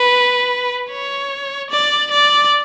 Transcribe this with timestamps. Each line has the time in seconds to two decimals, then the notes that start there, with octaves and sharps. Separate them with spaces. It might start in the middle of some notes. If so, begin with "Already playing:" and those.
Already playing: B4
0.89 C#5
1.70 D5
2.11 D5